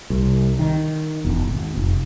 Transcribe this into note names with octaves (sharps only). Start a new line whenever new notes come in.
C2
D#3
E1
G#1
F1